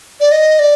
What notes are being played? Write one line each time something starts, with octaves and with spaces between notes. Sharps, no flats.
D5
D#5
D5